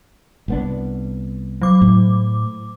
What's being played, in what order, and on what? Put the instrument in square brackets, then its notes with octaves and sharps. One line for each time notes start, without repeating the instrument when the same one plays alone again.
[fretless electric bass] C2 B3 D4
[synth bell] F#3 D6
[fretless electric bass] A2